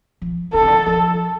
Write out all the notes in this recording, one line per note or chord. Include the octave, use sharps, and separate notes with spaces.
F3
D3 A4
C3
D3
F3